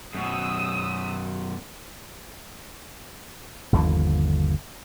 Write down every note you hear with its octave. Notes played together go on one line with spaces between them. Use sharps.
F#2 B2 D#6 E6
G1 D#2 D3 F3